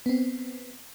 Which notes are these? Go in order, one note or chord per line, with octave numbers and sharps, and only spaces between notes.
B3 C4